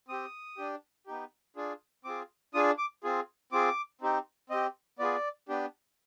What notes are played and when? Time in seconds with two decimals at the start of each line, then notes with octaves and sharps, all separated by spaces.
0.08 C4 G4 D#6
0.57 D4 G4
1.07 B3 D#4 G4
1.56 D4 F4 G#4
2.05 C4 F4 G#4 D6
2.54 D4 F4 G#4 D#6
2.78 D6
3.04 C4 F4 G#4
3.52 C4 F4 G#4 D6
4.01 C4 D#4 G4
4.50 C4 G4 D#5
4.99 B3 F4 G#4 D5
5.48 B3 D4 G4